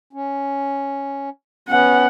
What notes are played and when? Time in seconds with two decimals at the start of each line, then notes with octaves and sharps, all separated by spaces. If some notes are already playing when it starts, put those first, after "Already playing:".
0.13 C#4
1.69 B3 C#4 F#5